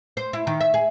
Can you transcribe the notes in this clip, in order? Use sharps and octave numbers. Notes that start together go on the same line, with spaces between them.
C5
E4
D#3
E5
G#4